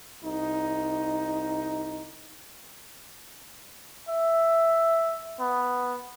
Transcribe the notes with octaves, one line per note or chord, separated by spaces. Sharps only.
C2 D#4
E5
B3